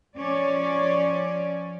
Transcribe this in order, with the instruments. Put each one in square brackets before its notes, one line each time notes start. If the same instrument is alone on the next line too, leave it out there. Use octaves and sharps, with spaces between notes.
[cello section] F3 C#4 C#5 D5